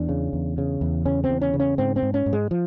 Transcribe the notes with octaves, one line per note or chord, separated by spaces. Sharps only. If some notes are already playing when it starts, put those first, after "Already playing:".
Already playing: E2 D4
C#3
E2
C#3
E2
C#3 C#4
C4
E2
C#4
C#3
C#4
G#2 C4
C4
G#2
C#4
G#2
G#3
F3